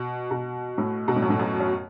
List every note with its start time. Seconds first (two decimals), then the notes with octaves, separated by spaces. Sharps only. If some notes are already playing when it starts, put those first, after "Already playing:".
Already playing: B2
0.31 B2
0.78 A2
1.08 B2
1.16 A2
1.22 F#2
1.30 A2
1.39 F#2
1.60 F#2